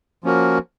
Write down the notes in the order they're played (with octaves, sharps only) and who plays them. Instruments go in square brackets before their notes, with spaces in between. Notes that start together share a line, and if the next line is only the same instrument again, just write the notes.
[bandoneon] F3 A#3 C#4 F#4 A#4